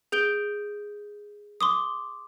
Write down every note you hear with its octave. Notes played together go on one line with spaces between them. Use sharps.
G#4 G6 D7 G7
C6 D6 D#6